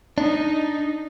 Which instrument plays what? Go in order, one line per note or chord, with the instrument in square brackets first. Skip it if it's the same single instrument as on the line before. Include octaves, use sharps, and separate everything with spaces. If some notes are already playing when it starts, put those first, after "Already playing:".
[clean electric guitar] D4 [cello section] D#4